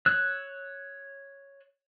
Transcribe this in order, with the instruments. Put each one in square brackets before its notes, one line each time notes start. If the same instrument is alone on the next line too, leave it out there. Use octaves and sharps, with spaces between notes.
[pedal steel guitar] C#5 E6 F#6